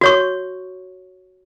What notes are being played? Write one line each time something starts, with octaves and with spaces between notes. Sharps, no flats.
F#4 C#5 C#6